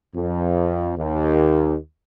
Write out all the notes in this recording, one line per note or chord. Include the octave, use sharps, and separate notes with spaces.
F2
D#2